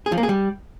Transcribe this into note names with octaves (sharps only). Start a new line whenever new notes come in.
G#4
F3
A#3
G#4
G3